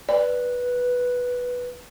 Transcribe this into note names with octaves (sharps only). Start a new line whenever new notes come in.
B4 D5